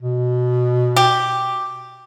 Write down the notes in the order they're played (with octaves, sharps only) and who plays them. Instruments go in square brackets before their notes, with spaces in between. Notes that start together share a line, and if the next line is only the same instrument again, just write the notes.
[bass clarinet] B2
[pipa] G4